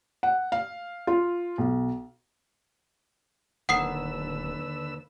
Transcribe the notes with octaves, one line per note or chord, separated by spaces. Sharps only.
F#5
F5
F4
B1
D1 D#2 D3 B4 F#5 D#6 E6 C7